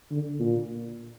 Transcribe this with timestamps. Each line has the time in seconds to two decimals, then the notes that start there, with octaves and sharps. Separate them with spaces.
0.11 D3
0.40 A#2